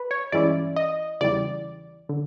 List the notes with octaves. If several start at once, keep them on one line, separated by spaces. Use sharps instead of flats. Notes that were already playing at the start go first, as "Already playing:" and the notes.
Already playing: B4
C#5
G2 E3 G#3 C#4 E4 D5
D#5
E2 C#3 E3 G3 D5
D3